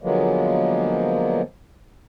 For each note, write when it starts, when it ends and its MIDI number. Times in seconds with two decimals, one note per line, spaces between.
0.02 1.42 50
0.02 1.42 53
0.02 1.42 54
0.02 1.42 56
0.02 1.42 58
0.02 1.42 59